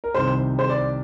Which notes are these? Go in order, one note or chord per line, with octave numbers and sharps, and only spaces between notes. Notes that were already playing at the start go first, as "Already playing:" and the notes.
A#4
C2 C3 D#3 C5
C5
D5